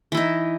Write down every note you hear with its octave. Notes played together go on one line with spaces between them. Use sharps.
E3 D#4 E4